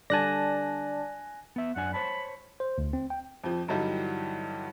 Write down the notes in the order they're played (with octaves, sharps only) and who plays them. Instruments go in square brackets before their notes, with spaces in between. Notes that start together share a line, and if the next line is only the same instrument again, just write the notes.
[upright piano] D3 G3 D4 [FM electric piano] D5 A5 [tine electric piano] G#5 F#6 A#6
[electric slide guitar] B3 E5
[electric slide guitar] F#2 D4 G#5 [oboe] F#5
[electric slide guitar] C5 C#5 A5 [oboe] B5
[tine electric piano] C5
D2
C4
G5
[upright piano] F2 F3
G2 D3 E3 F#3 G3 D#4